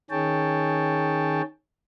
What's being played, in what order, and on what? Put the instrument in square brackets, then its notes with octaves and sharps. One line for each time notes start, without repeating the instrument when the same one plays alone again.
[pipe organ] D#3 C#4 G#4 C#5 G5 A5